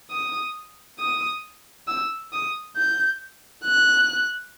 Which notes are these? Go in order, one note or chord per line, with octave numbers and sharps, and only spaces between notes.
D#6
D#6
E6
D#6
G6
F#6